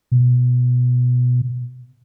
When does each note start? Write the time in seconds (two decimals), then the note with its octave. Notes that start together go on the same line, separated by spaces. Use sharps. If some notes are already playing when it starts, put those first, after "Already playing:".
0.12 B2